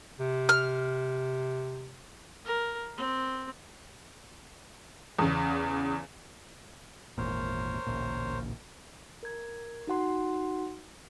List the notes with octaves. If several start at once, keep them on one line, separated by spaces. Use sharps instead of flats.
C3
F6
A#4
C4
E2 C#3
G#1 E2 A#2 A#4 C5 C#5
A1 D2 A#2
A#4 G#6
D#4 F#4 F#5 C6